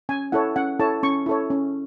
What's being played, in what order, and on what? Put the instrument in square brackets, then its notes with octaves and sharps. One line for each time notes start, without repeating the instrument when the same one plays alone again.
[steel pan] C#4 G#5
E4 A4 C#5 F#5
C#4 F#5
E4 A4 C#5 A5
C#4 C#6
E4 A4 C#5
C#4